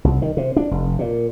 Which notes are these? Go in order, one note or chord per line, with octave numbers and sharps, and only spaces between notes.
C2
D#3
C3
D4
F1
A#2